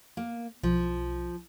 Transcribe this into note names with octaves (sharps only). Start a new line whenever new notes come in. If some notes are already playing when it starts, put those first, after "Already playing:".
A#3
B1 F3